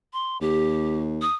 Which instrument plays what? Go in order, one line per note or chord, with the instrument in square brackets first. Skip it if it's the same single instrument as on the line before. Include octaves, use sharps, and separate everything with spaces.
[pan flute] C6
[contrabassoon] D#2 [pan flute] G4
[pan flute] D#6